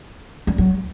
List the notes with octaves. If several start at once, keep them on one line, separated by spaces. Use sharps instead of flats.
G3
F#3